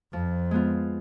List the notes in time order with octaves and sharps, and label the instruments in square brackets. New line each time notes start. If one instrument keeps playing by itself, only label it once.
[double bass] F2 [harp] F3
[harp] G#3 B3 F4